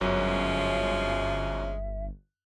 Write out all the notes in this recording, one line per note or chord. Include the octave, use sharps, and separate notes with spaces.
G1 F#2 F3 F#3 G#3 C#4 E5